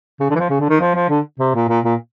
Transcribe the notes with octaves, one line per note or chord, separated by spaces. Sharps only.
C#3
D3
E3
F3
C#3
D3
D#3
F3
F3
D3
C3
A#2
A#2
A#2